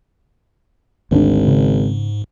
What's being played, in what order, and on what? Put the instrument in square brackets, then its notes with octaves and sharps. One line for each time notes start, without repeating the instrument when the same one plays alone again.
[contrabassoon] G#1 [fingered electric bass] D2 G#3 D4 [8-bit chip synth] G#2
[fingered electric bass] C#3